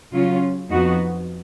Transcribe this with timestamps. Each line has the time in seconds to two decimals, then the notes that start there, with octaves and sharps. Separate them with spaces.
0.13 C#3 F#3 C#4 F4
0.69 F2 F3 B3 D#4 F#4